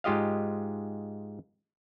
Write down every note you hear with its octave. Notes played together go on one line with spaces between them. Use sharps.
G#2 G#3 F4 G4 D#5 F5